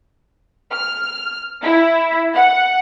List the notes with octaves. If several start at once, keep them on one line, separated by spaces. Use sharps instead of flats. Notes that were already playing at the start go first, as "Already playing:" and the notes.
F6
E4
F#5